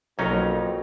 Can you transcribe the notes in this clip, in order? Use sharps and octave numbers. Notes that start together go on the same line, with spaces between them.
B1 F2 F#3 G#3 A#3 C#4 D#4